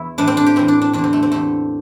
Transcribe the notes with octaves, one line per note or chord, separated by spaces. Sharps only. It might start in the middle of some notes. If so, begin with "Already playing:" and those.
Already playing: E2 E4
A2 E3 D4
C4
D4
G4
A2 E3 C4
D4
D4
E2 D3 D4
C4
A3
C4
E2 D3 A3